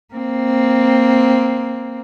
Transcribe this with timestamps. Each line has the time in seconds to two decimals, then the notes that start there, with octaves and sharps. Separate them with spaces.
0.14 A#3 C4